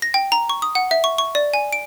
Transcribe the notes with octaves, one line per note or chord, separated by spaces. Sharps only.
A#6
G5
A#5
C#6
D#6
F#5
E5
C#6
C#6
D5
G#5
D7